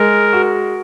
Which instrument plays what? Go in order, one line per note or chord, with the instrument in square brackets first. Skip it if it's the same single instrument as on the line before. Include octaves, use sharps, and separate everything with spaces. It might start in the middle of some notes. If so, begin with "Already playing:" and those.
Already playing: [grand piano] G#3 [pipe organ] A#4
[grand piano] F#4